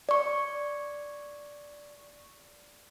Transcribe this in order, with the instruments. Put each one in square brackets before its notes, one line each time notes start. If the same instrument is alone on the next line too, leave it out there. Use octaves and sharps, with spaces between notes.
[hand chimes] D5 C#6